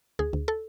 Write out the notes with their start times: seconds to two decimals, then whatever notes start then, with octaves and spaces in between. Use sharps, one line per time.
0.19 D2 G#4
0.33 D2
0.48 A4